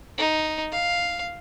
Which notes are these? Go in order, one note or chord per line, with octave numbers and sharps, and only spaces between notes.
D#4
F5